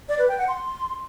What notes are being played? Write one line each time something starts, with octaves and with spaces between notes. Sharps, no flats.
D5
B4
G5
F#5
C6